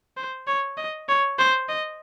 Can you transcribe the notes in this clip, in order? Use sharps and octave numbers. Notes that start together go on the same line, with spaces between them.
C5
C#5
D#5
C#5
C5
D#5